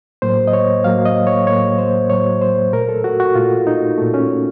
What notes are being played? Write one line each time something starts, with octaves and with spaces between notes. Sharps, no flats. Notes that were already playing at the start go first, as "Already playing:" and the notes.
A2 F#3 A#3 C5
D#5
C#5
A2 F#3 A#3 F5
D#5
C#5
A2 F#3 A#3 C#5
C5
A2 F#3 A#3 C#5
C5
A#2 A3 A#4
A4
F#4
F#4
A#2 A3 F4
D#4
A#2 A3
C#4